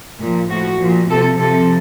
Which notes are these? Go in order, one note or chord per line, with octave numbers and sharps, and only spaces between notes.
A#2 F3
A2 F3 F#4
A#2 F3
C3 F3 A4
C3 F3 A4